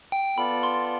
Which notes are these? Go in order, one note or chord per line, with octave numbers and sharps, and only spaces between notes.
G5
B3 F4 A4 D5 B5
C6